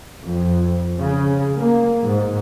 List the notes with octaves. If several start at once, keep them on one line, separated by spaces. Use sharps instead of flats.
F2
C#3
A#3
G#2